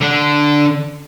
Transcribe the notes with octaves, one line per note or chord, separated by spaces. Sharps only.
D3 D4